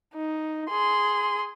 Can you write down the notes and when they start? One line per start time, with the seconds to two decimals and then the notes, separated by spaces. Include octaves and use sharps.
0.14 D#4
0.70 G#4 C6